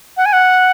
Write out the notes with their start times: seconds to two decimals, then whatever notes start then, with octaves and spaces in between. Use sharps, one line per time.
0.17 F#5
0.26 G#5
0.33 F#5